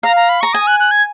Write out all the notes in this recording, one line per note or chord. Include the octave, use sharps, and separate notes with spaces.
F5 A#5
A#5
B5
A#5 C#6
G#5 D#6
F#6
F#6
G#6